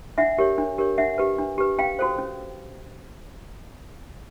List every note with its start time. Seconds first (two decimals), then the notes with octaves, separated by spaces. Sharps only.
0.18 D4 E5 F#5
0.38 G4 A#4 C#5
0.58 D4
0.78 G4 A#4 C#5
0.98 D4 E5 F#5
1.18 G4 B4
1.38 D4
1.58 G4 B4
1.78 C#4 F5 G5
1.99 F#4 A4 C5
2.18 C#4